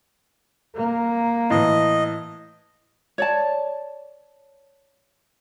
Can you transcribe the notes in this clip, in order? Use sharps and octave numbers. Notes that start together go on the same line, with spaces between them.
A#3
A2 E3 D#5
C#5 D5 A5